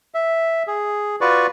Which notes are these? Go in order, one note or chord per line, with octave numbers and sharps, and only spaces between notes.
E5
G#4
F4 F#4 B4 D5 C#6